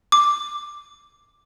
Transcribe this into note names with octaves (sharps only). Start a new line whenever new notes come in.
D6